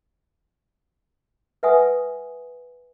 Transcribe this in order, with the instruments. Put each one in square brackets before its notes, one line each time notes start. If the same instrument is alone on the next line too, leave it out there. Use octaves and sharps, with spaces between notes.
[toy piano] B4 E5 F#5 G#5 D#6